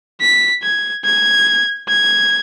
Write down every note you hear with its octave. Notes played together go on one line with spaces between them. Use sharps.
B6
G#6
G#6
G#6